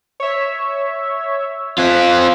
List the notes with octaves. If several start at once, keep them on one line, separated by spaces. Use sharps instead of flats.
C#5 E5
C4 F4 G#5 F#6 B6